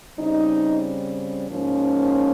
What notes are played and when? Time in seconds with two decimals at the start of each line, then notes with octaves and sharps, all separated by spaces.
0.17 C#3 G3 C4 D#4
1.50 G#2 F3 A#3 C#4